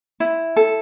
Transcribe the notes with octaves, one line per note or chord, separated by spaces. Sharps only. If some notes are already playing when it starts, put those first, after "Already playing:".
E4
A4